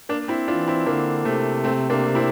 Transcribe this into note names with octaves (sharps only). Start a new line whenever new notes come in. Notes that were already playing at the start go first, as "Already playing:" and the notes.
A#3 D4
C4 E4
E3 D4 F4
C4 E4
D3 A#3 D4
C3 A3 C4
A3 C4
A#3 D4
C4 E4